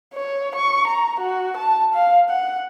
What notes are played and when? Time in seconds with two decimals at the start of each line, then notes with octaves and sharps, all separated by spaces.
0.14 C#5
0.55 C#6
0.88 A#5
1.20 F#4
1.57 A5
1.94 F5
2.30 F#5